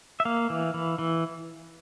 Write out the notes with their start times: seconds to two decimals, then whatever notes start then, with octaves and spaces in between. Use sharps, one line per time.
0.20 E5
0.25 A#3 F5
0.50 E3
0.74 E3
0.99 E3